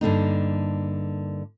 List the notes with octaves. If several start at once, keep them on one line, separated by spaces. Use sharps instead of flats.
G2 D3 A#3 D#4